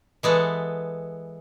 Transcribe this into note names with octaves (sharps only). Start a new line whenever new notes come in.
E3 G#3 B3 A4